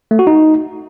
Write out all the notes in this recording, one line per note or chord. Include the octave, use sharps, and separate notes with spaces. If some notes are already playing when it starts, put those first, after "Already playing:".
A3
F#4
D#4